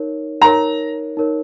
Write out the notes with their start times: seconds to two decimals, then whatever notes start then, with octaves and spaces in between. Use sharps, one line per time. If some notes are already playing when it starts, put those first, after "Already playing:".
Already playing: D#4 A#4 C#5
0.42 D#4 A#4 C#5 A#5
1.17 D#4 A#4 C#5